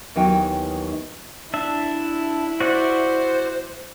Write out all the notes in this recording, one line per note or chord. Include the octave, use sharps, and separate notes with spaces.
D#2 E3 F#3 B3 D#4 G5
D4 E4 E5
F#4 C5 D5 F#5